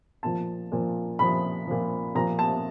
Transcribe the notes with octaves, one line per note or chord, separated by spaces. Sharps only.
A#2 F3 A5
A#2 F3
A#2 F3 B5
A#2 F3
A#2 F3 A#5
A5